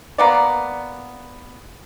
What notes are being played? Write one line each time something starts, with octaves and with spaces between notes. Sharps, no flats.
A#3 B3 D5